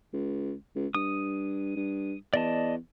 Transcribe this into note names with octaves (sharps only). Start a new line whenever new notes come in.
C#2
C#2
G2 D#6
G2
E2 D5 D#5 A5